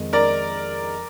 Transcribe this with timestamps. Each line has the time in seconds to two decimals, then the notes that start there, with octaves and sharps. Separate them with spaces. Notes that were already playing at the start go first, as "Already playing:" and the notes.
Already playing: F2 D#3 G#3
0.13 A#4 D5